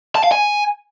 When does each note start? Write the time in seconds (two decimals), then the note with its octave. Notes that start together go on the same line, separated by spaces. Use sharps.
0.15 A5
0.24 F5
0.32 G#5